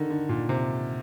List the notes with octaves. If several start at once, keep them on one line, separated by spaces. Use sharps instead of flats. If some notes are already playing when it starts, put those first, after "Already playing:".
Already playing: D3 D#3
D3
A#2
C3